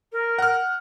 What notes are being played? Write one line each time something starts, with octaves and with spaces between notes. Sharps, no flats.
A#4
F#5 F6